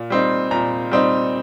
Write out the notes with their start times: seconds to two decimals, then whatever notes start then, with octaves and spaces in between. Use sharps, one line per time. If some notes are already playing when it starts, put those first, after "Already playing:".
Already playing: A#2
0.10 G3 C4 D#4
0.51 A#2 A#5
0.91 G3 C4 D#4